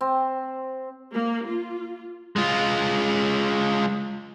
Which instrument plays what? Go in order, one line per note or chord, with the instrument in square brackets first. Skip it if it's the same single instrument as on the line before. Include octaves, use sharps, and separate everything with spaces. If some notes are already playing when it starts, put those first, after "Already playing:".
[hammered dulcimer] C4
[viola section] A#3
F4
[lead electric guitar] G#3 F4